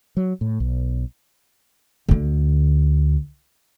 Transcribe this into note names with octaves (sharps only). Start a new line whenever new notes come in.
F#3
A2
B1
D2 D3